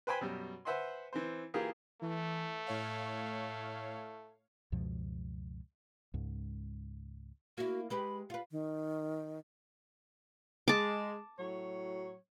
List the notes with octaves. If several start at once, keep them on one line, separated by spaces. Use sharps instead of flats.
B4 C5 G5 G#5 B5
F#2 B2 G3
B4 C5 E5 F#5 G#5 C6
E3 C4 C5
E3 A#3 F4 G4 G#4 A#4
E3 A3
A2 C#5 F5
C#2 F#2 B2 F3
C#2 G#2
A#3 E4 F#4
G#3 G4 B4 B5
F4 B4 F5
D#3
G#3 A5 D6
A2 F#3 C#5